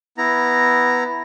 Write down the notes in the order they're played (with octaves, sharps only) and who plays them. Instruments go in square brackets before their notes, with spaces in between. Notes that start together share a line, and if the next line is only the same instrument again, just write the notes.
[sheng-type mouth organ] B3 E4 A#5